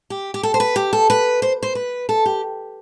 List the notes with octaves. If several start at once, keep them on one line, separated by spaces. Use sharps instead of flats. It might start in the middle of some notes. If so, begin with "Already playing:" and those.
G4
G4
A4
C5
B4
G4
A4
B4
C5
C5
B4
A4
G4